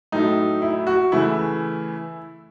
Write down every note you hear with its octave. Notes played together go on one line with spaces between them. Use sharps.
A2 F#3 A3 D#4
E4
F#4
C#3 E3 A3 E4